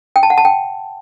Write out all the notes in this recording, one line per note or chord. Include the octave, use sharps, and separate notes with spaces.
G5
A5
F#5
A5
G5